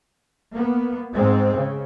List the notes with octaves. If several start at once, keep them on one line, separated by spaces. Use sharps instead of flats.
A#3 B3
G#2 G#3 C4
C#3